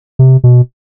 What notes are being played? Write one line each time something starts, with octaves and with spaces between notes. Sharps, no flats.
C3
B2